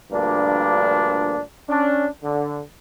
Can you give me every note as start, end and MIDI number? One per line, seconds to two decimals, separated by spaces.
0.12 1.39 38
0.12 1.39 43
0.12 1.39 46
0.12 1.39 53
0.12 1.39 58
0.12 1.39 62
1.69 2.06 61
1.69 2.06 62
2.23 2.60 50